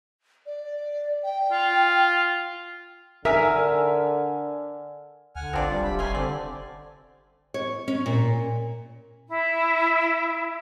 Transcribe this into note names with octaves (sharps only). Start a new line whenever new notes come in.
D5
G5
F4
D3 A#4 E5 G#5 E6 F6
D2 D3 F#5 G#5 F6
A#1 C4 D4 F4 D5
D#1 G3
C3 B5
G1 A3 C#4 G#5 C6
D3 C4 D5
C#5
C#4
A#2
E4